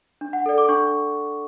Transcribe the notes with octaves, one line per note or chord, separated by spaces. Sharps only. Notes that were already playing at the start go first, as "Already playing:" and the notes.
D4
F#5
A4 D5
D6
D4 C#6